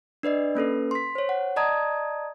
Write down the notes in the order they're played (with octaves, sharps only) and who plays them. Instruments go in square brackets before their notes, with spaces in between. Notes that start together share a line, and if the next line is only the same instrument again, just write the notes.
[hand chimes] D4 B4 D5 D#5
A#3 C#4 A4 B4
C6 B6
C5 C#5
F#5
D5 D#5 A5 A#5 D#6 G#6